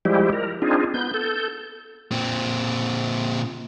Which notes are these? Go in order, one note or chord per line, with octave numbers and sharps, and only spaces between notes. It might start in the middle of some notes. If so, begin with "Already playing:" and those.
F3 G3 G#3 E4 G4
A#4
C4 D4 D#4 F4 G#4
B3 G6
A4 G6
A#2 C4